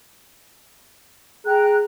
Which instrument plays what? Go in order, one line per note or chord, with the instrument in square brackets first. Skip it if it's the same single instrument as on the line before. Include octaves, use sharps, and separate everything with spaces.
[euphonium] G#4 [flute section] G5 A#5 F#6